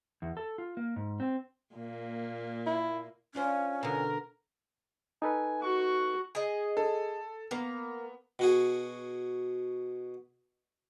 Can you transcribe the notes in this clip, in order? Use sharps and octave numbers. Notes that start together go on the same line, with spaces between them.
E2
A4
F4
A#3
G#2
C4
A#2 A#3
E4
C#4 D4 F4 C5
B2 D3 A#4
D#4 A4 B4 G#5
F#4 C#6
G#4 D#5
A4
A#3 B3
B2 F#4 G#4